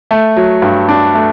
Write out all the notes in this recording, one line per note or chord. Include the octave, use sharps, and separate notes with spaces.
A3
F#3
G2
D4
A3